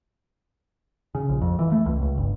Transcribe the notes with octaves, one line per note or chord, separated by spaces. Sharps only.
C#3
A#1
F2
E3
A3
C#2
C#2
G1